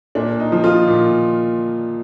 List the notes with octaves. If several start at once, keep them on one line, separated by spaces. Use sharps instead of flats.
A#2 D4
D#4
F3
F4
A#2